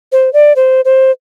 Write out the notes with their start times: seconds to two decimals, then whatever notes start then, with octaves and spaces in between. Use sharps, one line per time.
0.12 C5
0.33 D5
0.56 C5
0.85 C5